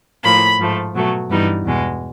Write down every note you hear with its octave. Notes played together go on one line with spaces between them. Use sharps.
A2 F3 A#3 B5
G#2 F3 A3
B2 F#3 A3
G2 E3 G3 B3 D#4
E2 B2 G#3